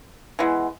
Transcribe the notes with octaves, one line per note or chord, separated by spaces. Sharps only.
E3 G#3 B3